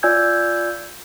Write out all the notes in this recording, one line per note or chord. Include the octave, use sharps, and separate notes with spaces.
F4 D5 G#5 E6 G6 G#6